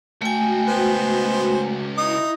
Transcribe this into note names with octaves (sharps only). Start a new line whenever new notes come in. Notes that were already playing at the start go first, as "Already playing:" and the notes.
C#2 A3 F#4 G5 G#5
B3 C5
D#4 E4 D#6 A#6